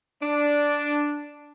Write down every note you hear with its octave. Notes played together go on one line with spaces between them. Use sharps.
D4